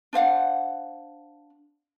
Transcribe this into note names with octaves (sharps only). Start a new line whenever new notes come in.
D4 C5 F5 F#5